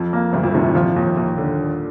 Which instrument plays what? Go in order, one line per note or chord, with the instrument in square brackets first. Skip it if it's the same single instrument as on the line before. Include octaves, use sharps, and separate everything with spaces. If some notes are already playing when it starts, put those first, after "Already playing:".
Already playing: [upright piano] F2 F3
[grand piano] A#3
[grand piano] D2 [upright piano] G2 G3
[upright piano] F2 F3
[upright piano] D#2 D#3 [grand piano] C3
[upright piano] A2
[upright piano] A#2 [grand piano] F3
[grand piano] D#2
D#2
D3